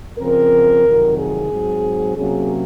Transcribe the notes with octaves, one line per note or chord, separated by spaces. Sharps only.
C#3 F3 C4 A#4
F2 C3 D#3 F#3
G#4
G#2 F#3 C4
C3 F#3 A#3 C#4 G#4